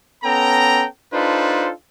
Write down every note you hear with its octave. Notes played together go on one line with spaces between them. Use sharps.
B3 C#4 A4 G5 A#5
D4 D#4 F4 A4 B4 C5